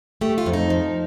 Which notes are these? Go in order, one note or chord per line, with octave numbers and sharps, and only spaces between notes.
A3 G4
F4
F2
D#4
F3